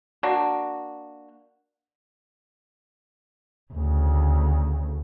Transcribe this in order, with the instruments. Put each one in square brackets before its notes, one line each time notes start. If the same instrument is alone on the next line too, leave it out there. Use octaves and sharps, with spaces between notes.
[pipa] A#3 D4 F#4
[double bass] D2 C#3